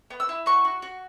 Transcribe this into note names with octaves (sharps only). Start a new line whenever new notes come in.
B3
E6
E4
F#4 C#6
F#4
F#4